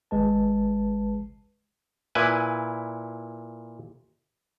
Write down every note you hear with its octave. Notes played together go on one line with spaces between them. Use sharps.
G#1 G#3 B4 A5
A#2 E4 B4 G#5